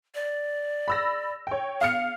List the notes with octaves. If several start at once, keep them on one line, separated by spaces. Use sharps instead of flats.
D5
B5 E6 A#6
C#5 G5
B3 F5 F6 C#7